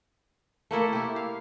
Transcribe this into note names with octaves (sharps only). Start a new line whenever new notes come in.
A3 A#3 E4 A4
E4 G4
F5